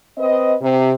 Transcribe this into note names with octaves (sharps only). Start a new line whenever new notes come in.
C4 B4 D#5
C3